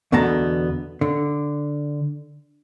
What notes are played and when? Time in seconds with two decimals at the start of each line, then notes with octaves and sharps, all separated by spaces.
0.12 E2 B2 D3 B3 A5 A#5
1.01 D3